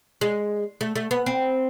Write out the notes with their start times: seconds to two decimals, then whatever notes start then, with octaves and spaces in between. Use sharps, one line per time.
0.21 G#3
0.81 A3
0.96 A3
1.11 B3
1.26 C4